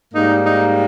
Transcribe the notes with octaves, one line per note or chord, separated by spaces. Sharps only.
G#2 G3 A#3 D#4
D#4